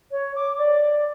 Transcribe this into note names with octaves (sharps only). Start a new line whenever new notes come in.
C#5
D6
D5